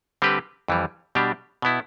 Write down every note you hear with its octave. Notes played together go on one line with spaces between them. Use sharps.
D3 G3 C4 G4 B4
F2 E3 G3
B2 G3 D4 G4
B2 B3 E4